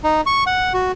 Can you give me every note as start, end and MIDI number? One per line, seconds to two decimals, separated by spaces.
0.04 0.21 63
0.26 0.44 85
0.47 0.73 78
0.74 0.92 66